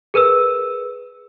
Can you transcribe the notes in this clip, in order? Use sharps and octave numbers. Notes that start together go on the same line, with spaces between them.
G#4 A#4 B4 E6